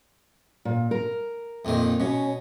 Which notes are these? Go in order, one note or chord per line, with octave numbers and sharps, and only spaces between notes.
A#2
A#4
F2 A#2 D#3
B2 C#4